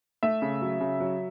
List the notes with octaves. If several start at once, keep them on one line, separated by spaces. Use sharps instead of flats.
A3 E5
C#3
F#3
C#3
F#3